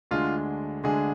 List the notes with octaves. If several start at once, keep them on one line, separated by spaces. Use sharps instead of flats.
D2 D3 G#3 D4 F4
D2 D3 G#3 D4 G#4